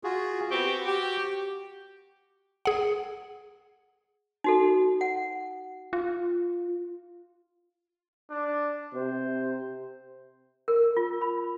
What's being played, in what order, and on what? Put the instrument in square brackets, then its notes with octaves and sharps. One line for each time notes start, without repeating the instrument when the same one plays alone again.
[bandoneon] F4 F#4 G#4
[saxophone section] B3 C4 G4 [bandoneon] F#4 C#6
[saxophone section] G4
[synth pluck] G#4 F#5
[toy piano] D#4 F#4 A4
F#5
[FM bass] F4
[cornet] D4
[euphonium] C3 [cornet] C5
[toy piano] A#4
F4
B5